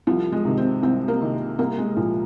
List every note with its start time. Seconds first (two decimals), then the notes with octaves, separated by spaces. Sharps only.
0.07 C2 F3
0.32 G#3
0.45 C3 D#3
0.57 C4
0.83 C2 C4
1.08 A#3
1.22 C3 D#3
1.59 C2 A#3
1.78 G#3
1.97 A#2 F3